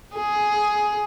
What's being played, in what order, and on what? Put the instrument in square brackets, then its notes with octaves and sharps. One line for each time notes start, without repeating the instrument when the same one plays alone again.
[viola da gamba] G#4